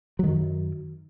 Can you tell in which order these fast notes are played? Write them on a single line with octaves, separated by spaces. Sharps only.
F#3 D#3 F#2